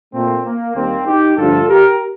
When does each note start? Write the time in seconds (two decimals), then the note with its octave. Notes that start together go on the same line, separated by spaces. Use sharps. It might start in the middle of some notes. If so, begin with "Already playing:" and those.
0.13 A#2 A3 C4
0.45 A#3
0.75 D#2 D#3 G3 A#3 C4
1.06 D#4 G4
1.37 G2 D3 F3 A3 F4 A4
1.68 G4 A#4